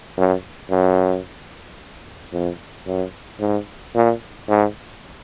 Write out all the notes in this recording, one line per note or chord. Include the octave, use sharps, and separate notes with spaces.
F#2
F#2
F2
F#2
G#2
A#2
G#2